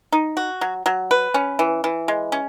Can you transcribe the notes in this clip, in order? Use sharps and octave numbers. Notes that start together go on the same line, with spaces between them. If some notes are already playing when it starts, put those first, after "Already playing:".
D#4
F#4
F#3
F#3
B4
C#4
E3
E3
G#3
C#4